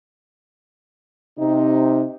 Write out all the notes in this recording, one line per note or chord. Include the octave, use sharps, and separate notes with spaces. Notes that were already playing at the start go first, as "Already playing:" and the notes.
C3 D#4